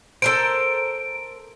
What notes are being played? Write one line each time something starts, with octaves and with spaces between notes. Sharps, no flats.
A4 A#4 C5 D7